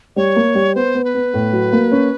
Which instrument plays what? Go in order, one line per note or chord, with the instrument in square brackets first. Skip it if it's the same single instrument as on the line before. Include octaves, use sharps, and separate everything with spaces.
[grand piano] G3 [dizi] C#5
[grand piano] A#3
G3
[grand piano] B3 [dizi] C5
[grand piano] B3
[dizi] B4
[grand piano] B3
A2
F#3
A#3
C#4